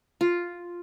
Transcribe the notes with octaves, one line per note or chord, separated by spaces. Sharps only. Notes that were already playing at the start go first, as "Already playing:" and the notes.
F4